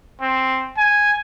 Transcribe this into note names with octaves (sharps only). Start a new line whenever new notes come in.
C4
G#5